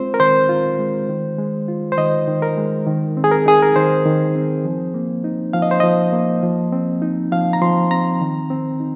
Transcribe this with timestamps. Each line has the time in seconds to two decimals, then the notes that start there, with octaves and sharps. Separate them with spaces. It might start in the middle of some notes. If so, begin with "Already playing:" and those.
Already playing: G#3 C4 F4 C5
0.14 A#4
0.20 D#3 C5
0.49 F4
0.79 G#3
1.09 D#3
1.39 G#3
1.68 F4
1.92 C5
1.98 D#3 D#5
2.27 D#3
2.42 A#4
2.57 G#3
2.87 D#3
3.17 C4
3.24 G#4
3.31 A#4
3.46 D#4 G#4
3.62 A#4
3.76 D#3 C5
4.06 D#3
4.35 C4
4.65 F3
4.94 A#3
5.24 D#4
5.53 F3 F5
5.62 D#5
5.71 C5
5.80 F3 D#5
6.13 A#3
6.43 F3
6.72 C4
7.02 D#4
7.32 F3 F5
7.53 A#5
7.62 F3 C6
7.91 C4 A#5
8.21 D#3
8.50 C4
8.80 D#4